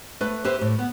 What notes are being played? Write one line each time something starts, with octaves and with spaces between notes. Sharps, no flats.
A3 B4
G4 B4 C5 E5
A2
B3